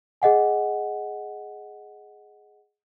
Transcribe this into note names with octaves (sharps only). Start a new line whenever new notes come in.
G#4 D#5 F#5 G#5